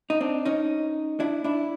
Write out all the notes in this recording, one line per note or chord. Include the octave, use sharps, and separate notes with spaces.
D#4
C4 D4
C#4 D#4
D4 E4
D4 E4